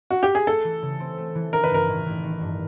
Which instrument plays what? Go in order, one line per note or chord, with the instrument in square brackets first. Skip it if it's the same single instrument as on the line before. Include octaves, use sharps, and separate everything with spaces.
[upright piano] F#4
G4
G#4
[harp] A3 [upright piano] A4
[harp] E3
C#3
C4
A3
E3
[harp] D#3 [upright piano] A#4
[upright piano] B4
[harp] G2 [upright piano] A#4
[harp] A1
A1
D#3
G2